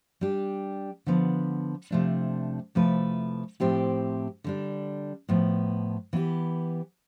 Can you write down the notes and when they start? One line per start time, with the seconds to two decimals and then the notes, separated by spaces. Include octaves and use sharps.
0.21 G3 D4 G4
1.07 D3 F3 B3
1.91 C3 F3 A3 D4
2.75 C3 F3 A3 E4 B4
3.60 A2 F3 C4 E4 G4
4.44 D3 G3 D4
5.29 A2 F3 B3
6.13 E3 B3 E4 G4